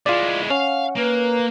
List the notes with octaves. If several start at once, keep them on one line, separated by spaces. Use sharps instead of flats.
G#3 E4 F4 D5
C#4 F5 F#5
A#3 B4